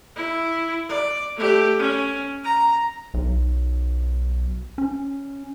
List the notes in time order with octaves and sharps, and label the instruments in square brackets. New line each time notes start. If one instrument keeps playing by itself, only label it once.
[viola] E4
D5
A3 G4
C#4
A#5
[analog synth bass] B1
C#4